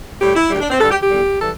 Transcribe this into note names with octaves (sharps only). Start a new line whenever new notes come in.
A2 G3 G4
E4
D2 D3 G3 G4
D4
C4
G2 D3 G3 A4
G4
G4
E2 D3 G3
E3 G3 A4